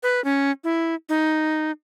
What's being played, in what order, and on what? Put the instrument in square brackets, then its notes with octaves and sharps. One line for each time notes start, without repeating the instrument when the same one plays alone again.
[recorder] B4
C#4
E4
D#4